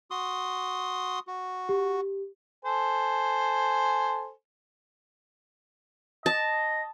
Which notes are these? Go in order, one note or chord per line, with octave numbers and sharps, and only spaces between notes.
F#4 C6 D#6
F#4
G4
A4 C5 G#5
D#5 A5